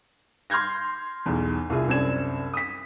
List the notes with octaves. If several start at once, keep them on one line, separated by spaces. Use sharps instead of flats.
C6 F6 G6 G#6 A#6
B1 E2
C2 F4 G#4 E5
C2 F#2 C4 D4 G#6 E7
D#6 B6